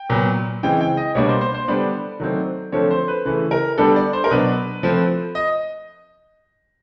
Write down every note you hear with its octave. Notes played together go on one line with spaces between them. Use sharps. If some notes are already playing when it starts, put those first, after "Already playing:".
Already playing: G5
A#2 F#3 B3
C#3 E3 G#3 C4 G5
G5
D#5
B2 G3 A#3 D4 C#5
C5
C5
C5
D3 G3 B3 D4 D5
D#3 F#3 A3 C4
D3 F3 A3 C4 C#5
C5
B4
C#3 E3 A3 B4
A#4
D3 G3 B3 D4 A4
D5
C5
A#4
B2 F#3 B3 D4 B4
F3 A3 C4
D#5